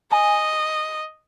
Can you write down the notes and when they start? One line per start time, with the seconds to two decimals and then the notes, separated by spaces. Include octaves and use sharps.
0.12 D#5 G#5